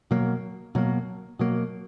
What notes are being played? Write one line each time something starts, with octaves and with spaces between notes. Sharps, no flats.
B2 F#3 A#3
B2 F#3 A#3
B2 F#3 A#3